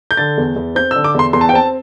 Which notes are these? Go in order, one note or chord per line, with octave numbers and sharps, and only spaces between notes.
G6
D3 A6
E2
E2
C4 G6
E6
D3
D6
E2 C6
E2 C6
A5
G5
C4 A5